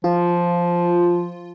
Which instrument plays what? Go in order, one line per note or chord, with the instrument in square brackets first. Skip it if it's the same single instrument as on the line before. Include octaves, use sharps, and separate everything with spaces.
[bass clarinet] F3 [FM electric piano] F4